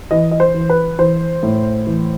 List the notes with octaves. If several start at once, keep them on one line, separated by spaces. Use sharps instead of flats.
E3 D#5
D#5
C5
E3
B4
E3 C5
A2
E3